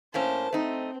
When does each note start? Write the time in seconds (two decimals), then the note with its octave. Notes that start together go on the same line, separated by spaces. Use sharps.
0.14 A2 A#3 C#4 C5 A5
0.53 A3 C4 D#4